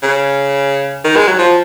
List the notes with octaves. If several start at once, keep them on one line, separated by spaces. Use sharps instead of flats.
C#3
D#3
G#3
F#3
F3